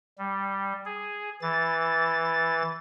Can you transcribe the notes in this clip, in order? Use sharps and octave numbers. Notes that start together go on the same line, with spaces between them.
G3
G#4
E3 A6